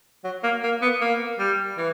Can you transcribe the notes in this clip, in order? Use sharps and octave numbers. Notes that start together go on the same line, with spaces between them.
F#3
A#3
A#3
B3
A#3
G3
E3